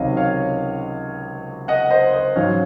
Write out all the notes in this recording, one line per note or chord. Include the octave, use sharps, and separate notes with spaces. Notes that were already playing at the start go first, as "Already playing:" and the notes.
Already playing: C#2 C3 D#3 F#3 C4 C#5 D#5 F5
C#5 F5
D#5 F#5
C5 D#5
C5 D#5
G#2 F#3 C#4 C#5 F5